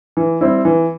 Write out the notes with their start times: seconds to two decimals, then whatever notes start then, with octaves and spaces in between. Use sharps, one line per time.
0.17 E3
0.41 G3 C4 E4
0.65 E3